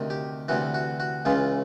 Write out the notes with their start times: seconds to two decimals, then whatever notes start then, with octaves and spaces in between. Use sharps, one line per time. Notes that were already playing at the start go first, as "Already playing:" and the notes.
Already playing: D2 C3 D#3
0.10 G4
0.48 D2 C3 E3 F#4
0.74 F#4
1.00 F#4
1.25 C#2 C#3 E3 F4